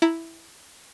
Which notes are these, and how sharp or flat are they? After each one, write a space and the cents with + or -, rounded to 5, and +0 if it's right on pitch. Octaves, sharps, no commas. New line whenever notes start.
E4 +0 A#5 +0